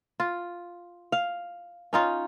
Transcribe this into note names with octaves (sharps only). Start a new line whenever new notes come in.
F4
F5
C#4 D#4 F4